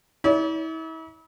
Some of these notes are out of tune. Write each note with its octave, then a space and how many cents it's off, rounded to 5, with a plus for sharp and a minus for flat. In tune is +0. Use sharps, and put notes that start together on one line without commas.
E4 -40 D5 -45